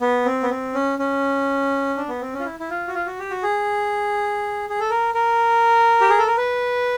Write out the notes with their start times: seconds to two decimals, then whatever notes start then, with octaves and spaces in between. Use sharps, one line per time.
0.01 B3
0.25 C4
0.43 B3
0.50 C4
0.74 C#4
0.99 C#4
1.97 D4
2.09 B3
2.21 C4
2.34 C#4
2.40 F4
2.45 E4
2.60 E4
2.70 F4
2.87 F#4
2.94 F4
3.06 F#4
3.19 G4
3.30 F#4
3.43 G#4
4.69 G#4
4.80 A4
4.90 A#4
5.14 A#4
6.01 G4
6.10 G#4
6.18 A4
6.27 A#4
6.37 B4